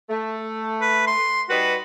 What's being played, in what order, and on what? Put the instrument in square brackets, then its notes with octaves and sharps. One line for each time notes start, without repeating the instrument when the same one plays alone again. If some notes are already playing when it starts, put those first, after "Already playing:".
[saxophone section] A3
[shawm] B4
C6
[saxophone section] G3 D#4 B4 [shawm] F#4